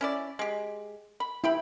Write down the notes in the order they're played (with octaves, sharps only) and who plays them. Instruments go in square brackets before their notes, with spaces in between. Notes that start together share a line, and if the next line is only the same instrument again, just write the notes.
[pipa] C#4 E4 D5
G#3 G4
B5
[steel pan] E4 [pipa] G4 G5 B5